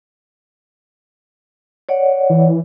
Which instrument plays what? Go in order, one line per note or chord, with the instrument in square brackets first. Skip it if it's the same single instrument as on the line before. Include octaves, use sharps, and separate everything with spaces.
[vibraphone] C#5 D5 F#5
[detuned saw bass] E3